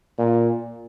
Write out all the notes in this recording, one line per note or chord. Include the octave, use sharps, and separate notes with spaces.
A#2